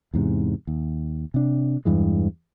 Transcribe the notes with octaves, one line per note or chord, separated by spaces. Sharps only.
E2 G#2 C3
D#2
C3 D4
E2 G2 E3 G#3